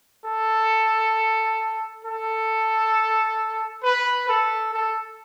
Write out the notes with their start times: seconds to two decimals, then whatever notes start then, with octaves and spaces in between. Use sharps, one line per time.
0.25 A4
2.04 A4
3.83 B4
4.29 A4
4.73 A4